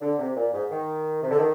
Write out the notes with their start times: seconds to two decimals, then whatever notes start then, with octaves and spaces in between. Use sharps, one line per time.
0.01 D3
0.18 C3
0.36 A#2
0.52 G#2
0.70 D#3
1.22 C3
1.30 D3
1.38 D#3